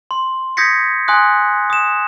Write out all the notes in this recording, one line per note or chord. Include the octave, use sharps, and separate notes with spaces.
C6
D#6 G6 G#6 A#6 B6 C#7
G#5 C6 D#6 F#6
D#6 E7